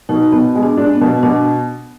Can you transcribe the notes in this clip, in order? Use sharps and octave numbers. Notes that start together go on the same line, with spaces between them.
B2 D#4
B2 B3
G#3
D4
D4
B3
B2
B2 D4